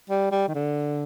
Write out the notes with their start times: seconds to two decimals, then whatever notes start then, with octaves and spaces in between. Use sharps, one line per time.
0.10 G3
0.32 G3
0.48 D#3
0.55 D3